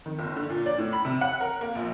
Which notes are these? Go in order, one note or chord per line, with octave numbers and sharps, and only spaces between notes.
D#3
F#1
D3
A#2
D5
A2
B5
C3
F#5
A#4
A#3
A#1